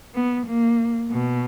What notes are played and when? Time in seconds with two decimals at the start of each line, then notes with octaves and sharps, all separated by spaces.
0.15 B3
0.47 A#3
1.11 B2